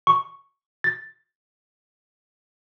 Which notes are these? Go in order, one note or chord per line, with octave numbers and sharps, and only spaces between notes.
C#6
A6